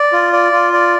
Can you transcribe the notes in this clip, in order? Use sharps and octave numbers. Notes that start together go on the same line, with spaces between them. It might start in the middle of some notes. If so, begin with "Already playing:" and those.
Already playing: D5
F4
D5
F4
D5